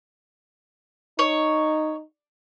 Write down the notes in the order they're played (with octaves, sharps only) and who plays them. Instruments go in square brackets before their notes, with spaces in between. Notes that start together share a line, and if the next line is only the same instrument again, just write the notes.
[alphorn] D#4 [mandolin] C#5